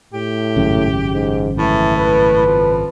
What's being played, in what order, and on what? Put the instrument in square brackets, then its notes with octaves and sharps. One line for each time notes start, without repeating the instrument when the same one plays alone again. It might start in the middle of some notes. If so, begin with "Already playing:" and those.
[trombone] A2 [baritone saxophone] G4
[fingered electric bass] G#1 F#2 C#3
[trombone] G#2
[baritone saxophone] A2 [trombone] E3
[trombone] B4
[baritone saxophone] F2